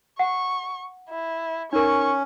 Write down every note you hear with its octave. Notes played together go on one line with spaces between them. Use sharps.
F#5 C#6
E4
C#4 D#4 A#4 C#6